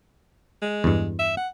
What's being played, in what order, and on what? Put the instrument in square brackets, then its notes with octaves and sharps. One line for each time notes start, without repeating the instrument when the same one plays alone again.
[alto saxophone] G#3
[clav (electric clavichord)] E2 G2
[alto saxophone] E5
F#5